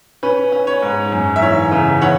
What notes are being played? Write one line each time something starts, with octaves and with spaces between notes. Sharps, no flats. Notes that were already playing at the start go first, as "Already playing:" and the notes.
C#4 B4
C#4
C#5
G#2
F#2
E5
E3 C#5
C#3
E3 C#5 F#5